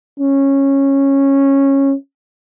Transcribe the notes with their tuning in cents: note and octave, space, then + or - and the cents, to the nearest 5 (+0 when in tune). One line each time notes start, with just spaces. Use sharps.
C#4 -15